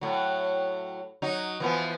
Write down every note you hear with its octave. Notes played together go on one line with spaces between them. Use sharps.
A2 F#3
F#3 D#4
E3 F3 B3